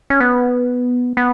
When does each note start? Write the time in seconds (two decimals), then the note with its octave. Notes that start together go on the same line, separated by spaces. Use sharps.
0.10 C#4
0.20 B3
1.17 B3